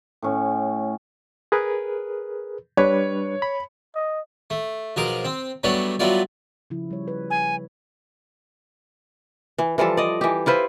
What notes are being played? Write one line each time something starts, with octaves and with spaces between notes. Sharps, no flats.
A2 C#4
G#4 A#4 B4
G3 D4 B4 C#5
B5
D#5
A3
B1 F3 G#4 A#4 D6
C4
F#3 G3 A3 B3 D4 C#5
F#3 G3 A3 B3 F4 D5
C#3 F3 E4
G3 C#5
B4
G#5
E3
E3 F3 G3 A4
D5 D#5
E3 G4
E4 F4 B4 C5